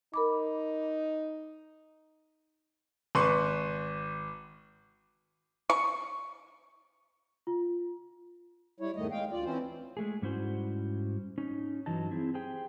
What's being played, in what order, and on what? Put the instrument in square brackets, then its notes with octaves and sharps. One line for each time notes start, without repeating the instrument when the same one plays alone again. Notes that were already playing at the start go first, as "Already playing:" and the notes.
[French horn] D#4 [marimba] A#4 B5 D6
[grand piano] G#1 B4 C6 C#6
[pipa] C#6
[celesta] F4
[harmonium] G3 E4 C#5
E2 G#2 D#3 A3 D#5
G#3 F5 G5
D2 F4 D5
E3 C4 C#4 E4 C5
[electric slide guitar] G#3 A3 G#4
G#2 G3 C#4 E4 F#4 C5
C#4 D#4
G2 E3 F#3 D#4 D#5 A5
C4 E4 G#4
G4 G#4 C5 G5